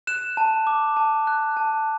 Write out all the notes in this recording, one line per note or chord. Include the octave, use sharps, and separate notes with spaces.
F#6 E7
A5
D6
A5
F#6
A5